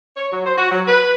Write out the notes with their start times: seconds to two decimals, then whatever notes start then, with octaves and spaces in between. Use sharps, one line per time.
0.17 C#5
0.32 F#3
0.46 C5
0.57 F#4
0.71 F#3
0.87 B4